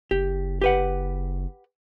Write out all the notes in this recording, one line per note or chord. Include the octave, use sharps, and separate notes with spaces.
F#1 G4
G4 B4 F#5